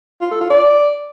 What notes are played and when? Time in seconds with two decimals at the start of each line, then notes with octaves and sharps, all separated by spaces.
0.21 F4
0.31 A4
0.41 F4
0.50 D5